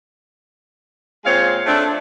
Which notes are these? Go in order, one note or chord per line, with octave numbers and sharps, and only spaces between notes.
A#2 G#3 C4 F4 C#5 F5
A3 C4 D4